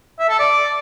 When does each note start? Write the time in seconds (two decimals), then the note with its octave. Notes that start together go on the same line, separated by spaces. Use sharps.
0.20 E5
0.29 A4
0.39 D5